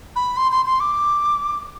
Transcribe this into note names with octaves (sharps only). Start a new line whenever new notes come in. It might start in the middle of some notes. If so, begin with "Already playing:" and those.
B5
C6
C6
C6
D6